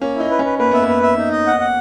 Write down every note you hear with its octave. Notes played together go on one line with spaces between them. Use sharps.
A#3 C#4
D#4 E4
B4
C#4
B4
A#3 B4
B3 E5
A#3
B4
E5
D#4
D#5
F#5
F#5